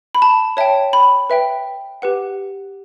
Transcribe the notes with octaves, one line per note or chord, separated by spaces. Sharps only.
B5
A5
C#5 E5 G5 A5
B5
B4 E5 G5
G4 B4 F#5